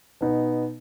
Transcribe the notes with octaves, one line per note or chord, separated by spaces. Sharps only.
B2 B3 D#4